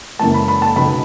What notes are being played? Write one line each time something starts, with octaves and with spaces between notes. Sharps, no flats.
F#2 C#3 E3 G#3 A5
B5
B5
A5
C#2 B2 F#3 B3 D#4 B5